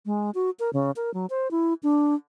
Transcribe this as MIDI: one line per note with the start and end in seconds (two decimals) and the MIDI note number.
0.06 0.31 56
0.35 0.50 66
0.60 0.70 70
0.73 0.91 49
0.96 1.13 70
1.14 1.26 54
1.30 1.51 72
1.51 1.74 64
1.83 2.15 62